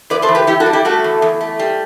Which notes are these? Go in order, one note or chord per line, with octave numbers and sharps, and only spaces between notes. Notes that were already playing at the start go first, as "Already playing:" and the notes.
E2 B4 D5
A4 C5
E3
G4 B4
E3 E4 G4
F#4 A4
G3
E4 G4
A3 F#4 A4
E2
E2
A3
G3